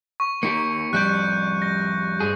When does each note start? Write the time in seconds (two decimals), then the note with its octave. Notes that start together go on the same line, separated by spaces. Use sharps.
0.20 C#6
0.43 A#3 D#4 G4 C#7
0.93 F2 G3 F#6 G6
1.62 A#6
2.20 G2 G#4